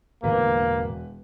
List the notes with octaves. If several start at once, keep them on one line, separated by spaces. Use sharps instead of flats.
E1 E2 A2 D3 A#3 B4